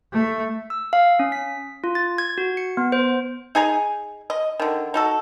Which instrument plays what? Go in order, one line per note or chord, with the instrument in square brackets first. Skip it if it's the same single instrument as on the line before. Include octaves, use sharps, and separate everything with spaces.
[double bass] A3
[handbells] E6
F5
C#4
B6
F4
A6
G#6
F#4
C#7
B3
C5
[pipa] D#4 G#4 G#5 A#5
D#5
D3 D#3
D#4 F#4 A4